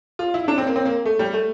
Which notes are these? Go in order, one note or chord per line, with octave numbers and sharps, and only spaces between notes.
F4
E4
E4
D4
C4
A#3
C4
A#3
A3
G3
A3